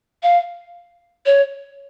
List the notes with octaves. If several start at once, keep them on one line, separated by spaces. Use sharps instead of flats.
F5
C#5